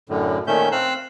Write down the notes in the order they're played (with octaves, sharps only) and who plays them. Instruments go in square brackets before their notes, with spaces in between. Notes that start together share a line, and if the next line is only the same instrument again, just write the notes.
[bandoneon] F#2 A2 D3
A#2 D#3 A3 C#4 E5 G6
C4 F5 E6 F#6